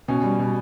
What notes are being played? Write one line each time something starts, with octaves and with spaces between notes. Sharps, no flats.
B2 C#4
G3
B2